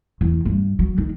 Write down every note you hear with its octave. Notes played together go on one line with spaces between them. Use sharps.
E2
G2
F#3
D#3